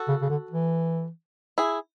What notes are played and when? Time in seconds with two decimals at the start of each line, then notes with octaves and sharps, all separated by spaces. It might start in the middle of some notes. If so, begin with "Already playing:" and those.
Already playing: F#4 A4
0.08 C#3
0.22 C#3
0.30 D3
0.51 E3
1.58 E4 G#4